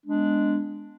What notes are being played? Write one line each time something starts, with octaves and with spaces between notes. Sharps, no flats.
G#3 B3 D4